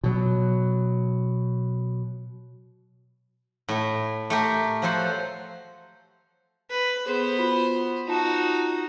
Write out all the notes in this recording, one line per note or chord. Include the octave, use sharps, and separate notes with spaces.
B2 F#3
A2 A3
A3 G4 A#4
F3 F#3 F#4 A4 C5
B4
B3 G#4 A4 C5
F4 F#4 B5
B5
D#4 F4 F#4 A5 E7